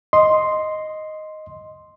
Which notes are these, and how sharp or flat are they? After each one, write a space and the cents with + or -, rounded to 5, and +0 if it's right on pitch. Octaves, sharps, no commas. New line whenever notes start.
D#5 +0 C6 +0